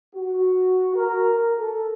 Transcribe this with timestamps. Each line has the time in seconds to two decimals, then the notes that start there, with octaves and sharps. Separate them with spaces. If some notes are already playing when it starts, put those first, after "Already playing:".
0.15 F#4
0.96 A#4
1.59 A4